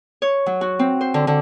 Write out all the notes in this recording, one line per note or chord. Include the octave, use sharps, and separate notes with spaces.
C#5
F#3
F#4
C4
C5
D3
D3